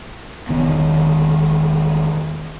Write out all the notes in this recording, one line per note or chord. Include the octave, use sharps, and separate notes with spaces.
E1 D#3 B3